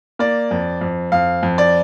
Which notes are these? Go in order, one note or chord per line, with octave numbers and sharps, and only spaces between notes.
A#3 D5
F2
F2
F2 F5
F2
D5